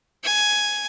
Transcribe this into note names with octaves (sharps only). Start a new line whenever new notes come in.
G#5